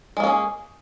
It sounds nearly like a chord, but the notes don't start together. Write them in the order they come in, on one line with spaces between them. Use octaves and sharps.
G#3 A#3 C#4 G#4